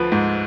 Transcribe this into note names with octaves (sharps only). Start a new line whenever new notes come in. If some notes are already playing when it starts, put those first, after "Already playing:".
Already playing: D2 F3 B4
G#2